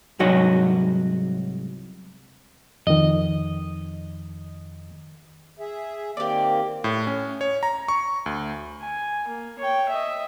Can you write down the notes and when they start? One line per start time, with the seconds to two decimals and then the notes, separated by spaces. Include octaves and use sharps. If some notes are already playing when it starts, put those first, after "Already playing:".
0.19 C2 G#2 F#3 F#4 C#5 D#5
2.87 F2 D#3 D#5
5.59 G#4 E5
6.17 D#3 A#3 C4 G4 D5
6.84 A2
7.07 C#4
7.41 C#5
7.63 A#5
7.88 C#6
8.26 D2
8.81 G#5
9.28 A#3
9.59 C#5 G5
9.89 D#5 E5